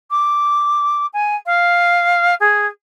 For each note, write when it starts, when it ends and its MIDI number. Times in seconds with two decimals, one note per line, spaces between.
0.10 1.06 86
1.13 1.36 80
1.46 2.34 77
2.40 2.67 68